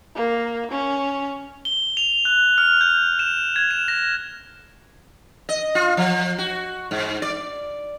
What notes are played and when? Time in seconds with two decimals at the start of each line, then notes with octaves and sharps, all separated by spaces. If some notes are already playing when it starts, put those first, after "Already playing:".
0.15 A#3
0.71 C#4
1.65 G7
1.97 F7
2.25 F#6
2.58 F6
2.81 G6
3.19 E7
3.56 G#6
3.71 E7
3.88 A#6
5.49 D#5
5.75 F4
5.97 F3
6.38 F#4
6.91 G#2
7.22 D5